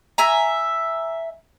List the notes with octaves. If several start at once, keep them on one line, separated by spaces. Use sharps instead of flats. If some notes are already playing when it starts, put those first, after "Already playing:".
E5 G#5 A#5